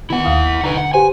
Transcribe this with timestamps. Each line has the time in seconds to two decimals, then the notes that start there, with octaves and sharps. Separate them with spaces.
0.10 D#3 B3 E4 F#5
0.25 D#2 F5 D#6
0.45 B6
0.64 D3 D#4 B4
0.77 F#5
0.94 G4 B4 C5 G#5